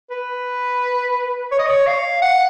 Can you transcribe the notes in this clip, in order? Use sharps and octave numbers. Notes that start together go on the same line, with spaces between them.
B4
C#5
D#5
C#5
F5
F#5